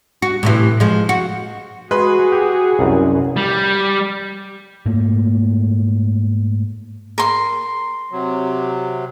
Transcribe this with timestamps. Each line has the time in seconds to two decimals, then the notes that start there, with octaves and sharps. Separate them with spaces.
0.22 F#4
0.43 A2 C3 E3
0.80 F3 G#3
1.09 F#4
1.91 G#3 F#4 G#4 B4 C6
2.32 G4
2.79 C2 F#2
3.37 G3
4.86 G#2 A3 A#3
7.18 A#4 C6
8.12 C3 F#3